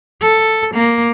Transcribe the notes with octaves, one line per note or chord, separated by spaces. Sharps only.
A4
A#3